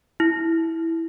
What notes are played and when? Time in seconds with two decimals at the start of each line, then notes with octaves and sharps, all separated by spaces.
0.20 E4